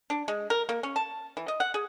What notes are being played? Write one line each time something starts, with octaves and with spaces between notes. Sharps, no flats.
D4
G#3
A#4
A#3
C#4
A5
E3
D#5
F#5
G#4